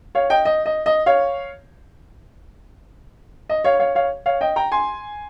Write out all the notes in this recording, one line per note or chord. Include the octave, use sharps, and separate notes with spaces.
C#5 F5
D#5 G5
D#5
D#5
D#5
C#5 F5
D#5
C#5 F5
C#5 F5
C#5 F5
C#5 F5
D#5 G5
G5 A#5
G#5 C6